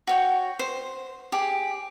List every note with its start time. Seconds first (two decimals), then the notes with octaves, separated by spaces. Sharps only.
0.07 F#4 C#5 G5
0.59 C5
1.32 G4 G#4